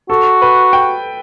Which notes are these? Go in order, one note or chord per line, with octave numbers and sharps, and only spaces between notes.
F#4 A4
B4
G5